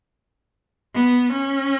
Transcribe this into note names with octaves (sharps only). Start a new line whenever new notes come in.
B3
C#4